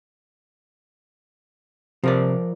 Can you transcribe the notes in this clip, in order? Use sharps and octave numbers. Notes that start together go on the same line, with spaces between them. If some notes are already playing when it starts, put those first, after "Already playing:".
C3 F3 A#4 D5